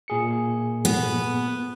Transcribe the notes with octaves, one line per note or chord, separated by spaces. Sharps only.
A#2 G#4 C#7
B3